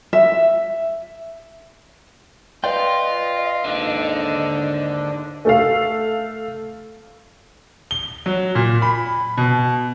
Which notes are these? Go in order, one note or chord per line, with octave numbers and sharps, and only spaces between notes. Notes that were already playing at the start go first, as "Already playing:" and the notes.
E5
F4 B4 D5 D#5 G5
D#2 G#2 D3 D4
A3 A4 F5
G7
F#3
A#2
B5
B2